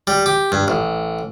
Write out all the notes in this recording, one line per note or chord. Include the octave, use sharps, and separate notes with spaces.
G3
G4
G2
A1